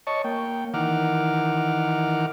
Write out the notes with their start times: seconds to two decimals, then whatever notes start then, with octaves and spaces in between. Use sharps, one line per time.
0.07 C#5 D#5 A5 C#6
0.24 A#3 G5
0.74 D#3 E3 A#4 F#5 D6 F6